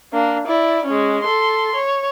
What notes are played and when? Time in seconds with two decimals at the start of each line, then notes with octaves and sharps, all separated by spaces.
0.13 A#3 D4
0.47 E4 D5
0.85 G#3 C#4
1.23 A4 C6
1.75 C#5